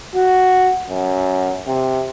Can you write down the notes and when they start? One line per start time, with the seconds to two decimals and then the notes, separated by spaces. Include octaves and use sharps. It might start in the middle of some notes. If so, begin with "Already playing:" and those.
0.15 F#4
0.90 F#2
1.68 C3